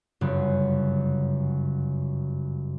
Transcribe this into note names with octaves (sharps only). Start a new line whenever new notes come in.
G1 F#2 C#3